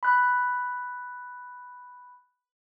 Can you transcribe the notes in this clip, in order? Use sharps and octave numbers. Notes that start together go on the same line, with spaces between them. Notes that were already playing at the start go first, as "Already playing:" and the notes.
B5 F#6